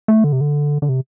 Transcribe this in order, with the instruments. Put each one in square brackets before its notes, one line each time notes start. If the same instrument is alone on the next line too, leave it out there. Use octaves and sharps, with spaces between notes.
[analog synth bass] A3
D3
C3
D3
D3
C3